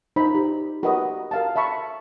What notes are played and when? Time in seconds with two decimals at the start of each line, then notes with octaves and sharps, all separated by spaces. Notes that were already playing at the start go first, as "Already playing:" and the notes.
0.16 D#4 C5 A#5 B5
0.35 G4
0.83 F#4 G4 A#4 B4 D#5
1.31 A#4 F5 A5
1.56 E5 A5 B5 C#6